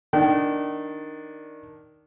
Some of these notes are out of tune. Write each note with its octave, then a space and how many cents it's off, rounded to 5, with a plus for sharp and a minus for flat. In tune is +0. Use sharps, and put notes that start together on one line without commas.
D#3 +0 D4 +0 G5 -40